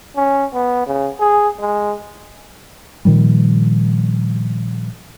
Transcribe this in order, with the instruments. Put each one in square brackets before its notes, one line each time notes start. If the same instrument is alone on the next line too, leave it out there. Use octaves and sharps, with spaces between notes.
[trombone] C#4
B3
C#3
G#4
G#3
[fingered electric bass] A#2 D#3 F3 G3